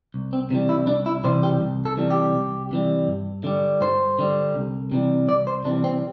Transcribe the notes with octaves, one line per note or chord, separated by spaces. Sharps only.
C2
C4
C3 E3 G3
E4
C2 D4
E4
C3 E3 G3 C5
G4
C2
A4
C3 E3 G3
G4
C2
C3 E3 G3
G2
D3 G3
G2 C5
D3 G3
C2
C3 E3 G3
C2 D5
C5
C3 E3 G3 D4
C4